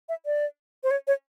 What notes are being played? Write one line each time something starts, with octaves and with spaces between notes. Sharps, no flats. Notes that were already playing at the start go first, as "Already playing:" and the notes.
E5
D5
C5
C#5
C#5